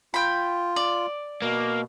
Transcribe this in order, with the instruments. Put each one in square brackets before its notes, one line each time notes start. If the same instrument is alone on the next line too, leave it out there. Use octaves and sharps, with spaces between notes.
[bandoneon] F4 [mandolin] G5 B5
[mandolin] D5
[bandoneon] B2 [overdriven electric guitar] A#3